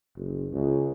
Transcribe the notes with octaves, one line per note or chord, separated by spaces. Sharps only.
F#1
C#2